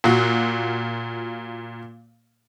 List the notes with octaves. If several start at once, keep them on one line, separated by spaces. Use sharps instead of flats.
A#2 F4 F#4